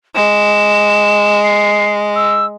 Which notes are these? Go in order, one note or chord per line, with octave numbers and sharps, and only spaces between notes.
G#3 E7
C7
E6